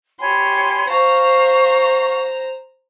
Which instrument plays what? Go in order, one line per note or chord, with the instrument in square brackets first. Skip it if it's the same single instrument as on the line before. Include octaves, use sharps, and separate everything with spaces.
[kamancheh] G4 C6 [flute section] C#5 G#5 B5
[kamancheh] C5 A#5 [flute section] F5 C#6